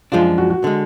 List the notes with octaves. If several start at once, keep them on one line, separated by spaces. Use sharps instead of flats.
F#2 F3 G#3 D4 F4
F#4
F#4
D3 G#3